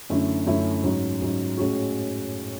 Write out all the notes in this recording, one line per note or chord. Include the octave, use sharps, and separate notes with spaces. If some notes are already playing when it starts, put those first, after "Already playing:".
F#2 D3 A3 C#4 E4
F#2 D3 A3 C#4 E4
G#2 F#3 C#4
G#2 F#3 C#4
A2 G#3 C#4 F#4